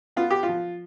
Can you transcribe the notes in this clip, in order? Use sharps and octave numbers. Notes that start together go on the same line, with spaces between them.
B3 F4
G4
F4
F3